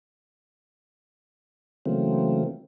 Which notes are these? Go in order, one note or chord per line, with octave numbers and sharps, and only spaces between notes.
C#3 E3 F#3 A3 A#3 C4